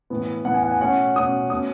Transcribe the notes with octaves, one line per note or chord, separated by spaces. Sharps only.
A2 E3 B3
A2 E3 B3 F#5
G#5
F#5
G#5
B2 A3 C#4 F#5
B2 A3 C#4 D#6
B2 A3 C#4 D#6